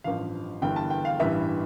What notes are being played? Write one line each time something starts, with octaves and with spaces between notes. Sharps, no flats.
A1 G2 F3 F5
G1 G2 E3 G5
A5
G5
F5
A1 G2 E3 G3 E5